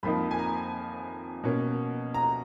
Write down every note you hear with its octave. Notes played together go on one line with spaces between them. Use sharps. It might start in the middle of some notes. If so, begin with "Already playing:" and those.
F2 F3 A#3 D#4 B5
G#5
A#5
B2 A#3 C#4
A#5